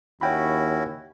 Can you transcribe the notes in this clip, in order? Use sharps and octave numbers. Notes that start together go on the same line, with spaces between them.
D#2 C#4 E4 F#4 C#5 G5 B5